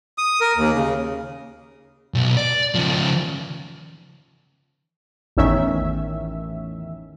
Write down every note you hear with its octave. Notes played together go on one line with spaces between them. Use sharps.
D#6
A#4
D#2
C#3
B1
D5
C#3 F3
A1 E2 D#3 C#4 E5